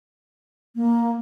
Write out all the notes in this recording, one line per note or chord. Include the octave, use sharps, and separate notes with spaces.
A#3